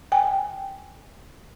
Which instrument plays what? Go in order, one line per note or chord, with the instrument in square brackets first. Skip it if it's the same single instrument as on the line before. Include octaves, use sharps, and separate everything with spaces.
[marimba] G5 G#5